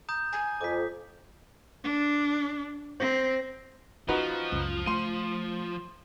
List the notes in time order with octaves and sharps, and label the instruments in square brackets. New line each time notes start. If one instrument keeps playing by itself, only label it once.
[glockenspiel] A#5 D#6 G6
[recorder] G#5
[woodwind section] F2 [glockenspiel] D6 B6
[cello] D4
[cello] C4 [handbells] C5 A#6
[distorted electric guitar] F3 [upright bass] C#4 [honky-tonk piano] D#4 F#4 B4
[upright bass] C#2 F#2
[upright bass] A3 [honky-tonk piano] C6 D#7